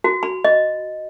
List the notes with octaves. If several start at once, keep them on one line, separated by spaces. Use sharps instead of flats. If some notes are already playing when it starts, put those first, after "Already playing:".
F#4
B5
D#5